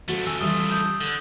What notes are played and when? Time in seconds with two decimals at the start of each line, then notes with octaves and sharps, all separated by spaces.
0.08 C#3 F#3 A3 F#4 C5
0.26 G#5 E6
0.41 E3 F3 G3 D#6
0.71 D#6 G6
1.01 D3